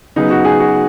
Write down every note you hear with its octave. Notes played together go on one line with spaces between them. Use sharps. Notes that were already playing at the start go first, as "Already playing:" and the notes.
C#3 F#3 B3 D#4 G#4
F#4
G#4
F#4